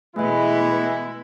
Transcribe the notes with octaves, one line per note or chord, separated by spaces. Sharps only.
B2 E3 G#3 A3 B3 E4 D#5